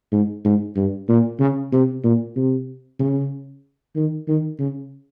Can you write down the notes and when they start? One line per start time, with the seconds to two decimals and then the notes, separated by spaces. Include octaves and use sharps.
0.12 G#2
0.45 G#2
0.76 G2
1.08 A#2
1.40 C#3
1.72 C3
2.04 A#2
2.36 C3
3.00 C#3
3.96 D#3
4.28 D#3
4.59 C#3